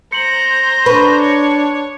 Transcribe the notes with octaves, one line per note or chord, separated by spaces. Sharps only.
C5 A#5 C#7 F#7
D4 B4 B5 C#6
C#5